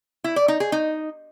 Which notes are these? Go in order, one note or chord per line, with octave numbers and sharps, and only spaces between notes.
E4
D5
D#4
G#4
D#4